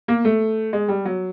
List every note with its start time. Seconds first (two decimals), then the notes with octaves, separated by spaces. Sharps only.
0.08 A#3
0.25 A3
0.73 G#3
0.88 G3
1.05 F#3